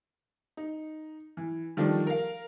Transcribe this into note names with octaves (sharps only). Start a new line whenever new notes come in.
D#4
E3
D#3 F3 G3 A3 D4
A#4 F5